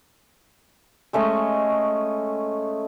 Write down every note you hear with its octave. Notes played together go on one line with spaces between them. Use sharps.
G#3 A3 C#4 D#5